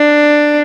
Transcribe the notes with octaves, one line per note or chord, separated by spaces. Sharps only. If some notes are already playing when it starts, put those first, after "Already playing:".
Already playing: D4